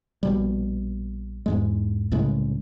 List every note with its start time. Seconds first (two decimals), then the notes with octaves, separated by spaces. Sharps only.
0.23 A#1 B2 G3
1.46 E2 G#2 G#3
2.11 C2 A2 C#3 G#3